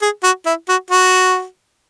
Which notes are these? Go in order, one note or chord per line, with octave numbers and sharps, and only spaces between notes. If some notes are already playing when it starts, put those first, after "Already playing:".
G#4
F#4
E4
F#4
F#4